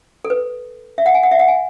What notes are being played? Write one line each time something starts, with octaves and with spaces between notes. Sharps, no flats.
A4
B4
E5
F#5
G#5
F#5
E5
F#5
G#5